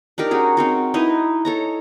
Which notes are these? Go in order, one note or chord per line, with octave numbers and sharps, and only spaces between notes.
D4 D#4 G4 A#4
C#4 F#4 G#4
C4 D#4 F#4
D#4 E4 B4 D#5
A4 C#5 A#5